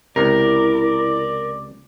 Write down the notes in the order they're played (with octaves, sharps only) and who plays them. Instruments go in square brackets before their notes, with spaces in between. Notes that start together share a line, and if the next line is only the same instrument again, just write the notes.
[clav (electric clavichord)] C#2 C3 [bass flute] E4 [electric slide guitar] A#4 [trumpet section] D5